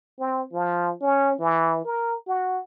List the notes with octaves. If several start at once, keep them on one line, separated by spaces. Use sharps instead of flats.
C4
F3
C#4
E3
A#4
F#4